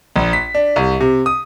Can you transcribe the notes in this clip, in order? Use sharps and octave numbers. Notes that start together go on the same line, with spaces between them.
A#1
B6
D4
C2
C3
D#6